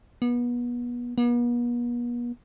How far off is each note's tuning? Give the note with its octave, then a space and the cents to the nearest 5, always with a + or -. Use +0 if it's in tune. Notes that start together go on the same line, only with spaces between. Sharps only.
B3 -30
B3 -45